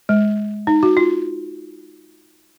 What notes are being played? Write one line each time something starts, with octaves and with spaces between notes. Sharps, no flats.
G#3
D#4
F#4
F4